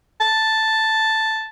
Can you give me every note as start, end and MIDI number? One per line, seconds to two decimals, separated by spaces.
0.21 1.48 81